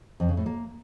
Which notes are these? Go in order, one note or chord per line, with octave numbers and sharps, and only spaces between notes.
F2
C#3
A2
A#3